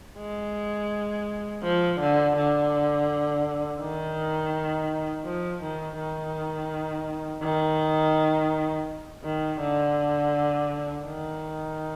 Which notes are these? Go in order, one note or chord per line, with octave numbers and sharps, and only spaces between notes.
G#3
F3
D3
D3
D#3
F3
D#3
D#3
D#3
D#3
D3
D#3